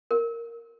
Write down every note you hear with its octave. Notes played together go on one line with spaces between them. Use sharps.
A#4